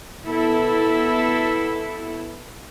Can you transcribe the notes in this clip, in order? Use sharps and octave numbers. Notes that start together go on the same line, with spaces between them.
B2 B3 E4 A4